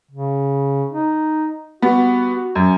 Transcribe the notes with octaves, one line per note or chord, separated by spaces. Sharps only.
C#3
D#4
G3 B3 F#4
F#2 C#4